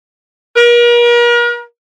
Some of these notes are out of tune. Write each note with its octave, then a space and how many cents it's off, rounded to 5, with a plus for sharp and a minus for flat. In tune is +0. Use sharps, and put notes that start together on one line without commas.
A#4 +40